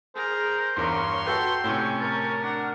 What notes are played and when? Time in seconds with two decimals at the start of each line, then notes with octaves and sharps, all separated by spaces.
0.16 G#4 A#4 C5
0.77 E2 G2 A#4 C#5 C6
1.26 F#4 A4 B4 G5
1.64 A2 C3 C#4
2.01 A#4 A5
2.44 D4 F#5